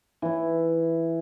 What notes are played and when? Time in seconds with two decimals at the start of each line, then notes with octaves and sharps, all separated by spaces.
0.22 E3 E4